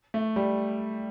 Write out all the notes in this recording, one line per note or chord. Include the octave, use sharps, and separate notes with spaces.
A3
G3